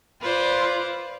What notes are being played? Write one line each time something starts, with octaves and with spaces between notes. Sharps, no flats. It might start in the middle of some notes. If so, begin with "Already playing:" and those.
F4 B4 C5 D5